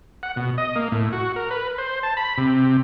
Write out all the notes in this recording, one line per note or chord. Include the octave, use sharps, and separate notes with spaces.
F#5
B2
D#5
A#3
A2
F#4
A#4
B4
C5
A5
B5
C3